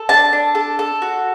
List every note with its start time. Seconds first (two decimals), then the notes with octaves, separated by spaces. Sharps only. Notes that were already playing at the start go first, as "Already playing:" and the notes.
Already playing: A4
0.09 D4 A5
0.33 D4
0.55 A4
0.79 A4
1.02 F#4